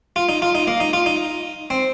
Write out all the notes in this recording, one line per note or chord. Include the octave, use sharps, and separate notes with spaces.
F4
D#4
F4
D#4
A#3
D#4
F4
D#4
C4